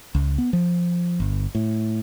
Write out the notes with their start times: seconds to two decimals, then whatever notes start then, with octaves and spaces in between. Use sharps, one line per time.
0.15 C#2
0.38 B3
0.53 F3
1.20 G1
1.55 A2